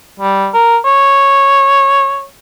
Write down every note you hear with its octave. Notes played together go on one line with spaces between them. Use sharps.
G3
A#4
C#5